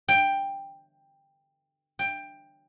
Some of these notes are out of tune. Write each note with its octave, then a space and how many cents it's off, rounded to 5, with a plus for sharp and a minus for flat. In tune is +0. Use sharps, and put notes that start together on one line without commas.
G5 +10
G5 +15